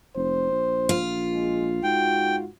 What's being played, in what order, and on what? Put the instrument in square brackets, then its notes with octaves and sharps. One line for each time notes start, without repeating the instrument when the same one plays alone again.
[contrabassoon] F1 [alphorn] C5
[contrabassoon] A#1
[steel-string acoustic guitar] F4
[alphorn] G#3
[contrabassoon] G#2 [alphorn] F#4 [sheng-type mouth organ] G5